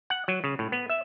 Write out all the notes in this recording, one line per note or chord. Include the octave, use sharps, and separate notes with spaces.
F#5
F#3
C#3
A2
B3
E5